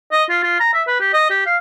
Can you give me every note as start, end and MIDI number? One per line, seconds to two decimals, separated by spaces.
0.12 0.24 75
0.30 0.39 65
0.43 0.58 65
0.60 0.72 82
0.74 0.83 76
0.88 0.96 71
1.00 1.12 67
1.14 1.30 75
1.31 1.44 67
1.46 1.57 77